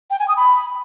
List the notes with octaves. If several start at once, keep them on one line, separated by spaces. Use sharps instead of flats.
G5
G#5
D#6
B5